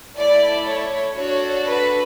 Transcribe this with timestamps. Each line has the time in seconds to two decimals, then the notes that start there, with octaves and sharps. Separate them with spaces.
0.15 A3 E4 A4 D5
0.66 C#5
1.16 D4 F#4 A4 C#5
1.68 B4